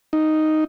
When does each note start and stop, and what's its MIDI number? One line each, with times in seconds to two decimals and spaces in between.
0.13 0.64 63